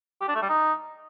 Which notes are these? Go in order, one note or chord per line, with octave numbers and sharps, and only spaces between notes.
G4
D4
A3
G3
D#4